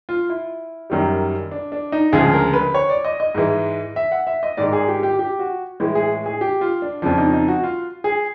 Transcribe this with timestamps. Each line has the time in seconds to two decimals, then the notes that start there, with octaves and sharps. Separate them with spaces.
0.09 F4
0.30 E4
0.90 F#2 D#3 G3
1.52 D4
1.72 D4
1.92 D#4
2.13 D2 C#3 F3 G#3 G#4
2.34 A#4
2.54 B4
2.74 C#5
2.89 D5
3.05 D#5
3.20 D#5
3.35 G#2 E3 G#3
3.96 E5
4.12 F#5
4.27 E5
4.43 D#5
4.57 G#2 D#3 G#3 D5
4.73 G#4
4.88 G4
5.03 G4
5.19 G4
5.39 F#4
5.80 A2 E3 G#3 E4
5.95 G#4
6.26 G#4
6.41 G4
6.61 F4
6.82 D4
7.02 F2 C#3 F3 D4
7.18 D#4
7.33 D#4
7.48 F#4
7.63 F4
8.04 G#4